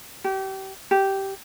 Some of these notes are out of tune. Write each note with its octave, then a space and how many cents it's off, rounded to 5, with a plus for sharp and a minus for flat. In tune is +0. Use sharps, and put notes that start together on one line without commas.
G4 -30
G4 -10